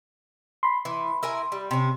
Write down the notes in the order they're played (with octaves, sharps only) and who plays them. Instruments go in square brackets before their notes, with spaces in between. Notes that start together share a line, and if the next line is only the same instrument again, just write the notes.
[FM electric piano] B5 C6
[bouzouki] E3
E4 A#4 G#5
G3
C3 C#4